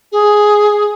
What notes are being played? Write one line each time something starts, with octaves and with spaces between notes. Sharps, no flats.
G#4